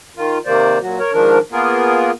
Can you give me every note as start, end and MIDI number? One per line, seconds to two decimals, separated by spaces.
0.17 0.38 51
0.17 0.38 65
0.46 0.78 48
0.46 0.78 51
0.46 0.78 58
0.46 0.78 72
0.46 0.78 74
0.82 0.99 46
0.82 0.99 54
0.82 0.99 66
0.99 1.12 70
0.99 1.12 73
1.13 1.38 44
1.13 1.38 51
1.13 1.38 53
1.13 1.38 62
1.13 1.38 70
1.52 2.11 58
1.52 2.11 59
1.52 2.11 65
1.52 2.11 68
1.52 2.11 70